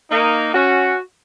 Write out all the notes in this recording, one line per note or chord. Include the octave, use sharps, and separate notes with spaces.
A#3 D#4
C#4 F#4